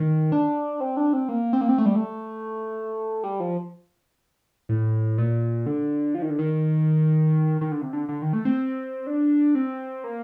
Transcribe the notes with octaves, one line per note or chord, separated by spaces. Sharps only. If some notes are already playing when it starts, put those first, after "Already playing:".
Already playing: D#3
D4
C4
D4
C4
A#3
C4
A#3
C4
A3
G3
A3
G3
F3
A2
A#2
D3
F3
D#3
D3
D#3
D#3
D3
C3
D3
D3
D#3
A3
C4
D4
C4
A#3